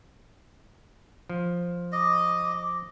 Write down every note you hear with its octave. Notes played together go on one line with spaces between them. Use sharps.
F3
D#5 D6